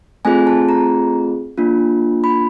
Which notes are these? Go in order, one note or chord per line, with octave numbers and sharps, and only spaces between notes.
A3 C4 F4 G#4 G#5
A5
A#5
A#3 D4 F4
B5